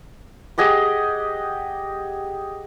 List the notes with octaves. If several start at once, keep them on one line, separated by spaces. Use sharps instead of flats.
G4 G#4 D#5 F#5